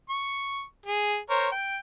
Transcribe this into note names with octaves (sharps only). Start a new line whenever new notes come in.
C#6
G#4
A#4 C5 C#5
G5